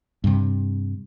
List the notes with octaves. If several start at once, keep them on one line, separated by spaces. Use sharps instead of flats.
G2 C3